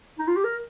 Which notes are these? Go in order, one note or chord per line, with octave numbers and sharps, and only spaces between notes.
D#4
F4
G4
A#4